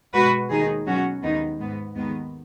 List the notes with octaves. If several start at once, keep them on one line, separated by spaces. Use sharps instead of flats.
B2 G#3 F#4 B4
D#2 D#3 G#3 D#4 G#4
B2 F#3 C#4 F#4
D#2 D#3 G#3 B3 D#4
G#2 G#3 B3
D#2 D#3 G#3 B3